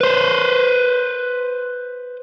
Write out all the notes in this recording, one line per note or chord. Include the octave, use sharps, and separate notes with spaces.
B4 C5